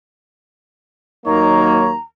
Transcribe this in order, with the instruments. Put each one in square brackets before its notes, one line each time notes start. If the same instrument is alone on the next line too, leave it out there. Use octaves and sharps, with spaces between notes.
[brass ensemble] D#2 F#3 A#3 [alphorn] D#4 [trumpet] C#5 [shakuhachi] A#5